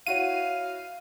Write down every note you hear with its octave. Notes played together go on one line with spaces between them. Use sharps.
E4 F#4 C#5 F5 D#7